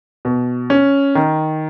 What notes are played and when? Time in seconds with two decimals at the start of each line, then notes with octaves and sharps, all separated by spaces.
0.25 B2
0.70 C#4
1.15 D#3